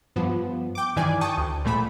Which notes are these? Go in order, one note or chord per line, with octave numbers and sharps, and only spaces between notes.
G2 F3 B3
G5 D6
G2 D#3 E3 D5 G#5
G5 A5 C#6 D#6
D2
A#1 A#2 A3 B5